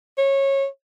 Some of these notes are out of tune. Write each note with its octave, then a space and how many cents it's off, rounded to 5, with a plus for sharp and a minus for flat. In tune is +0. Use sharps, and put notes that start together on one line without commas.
C#5 -20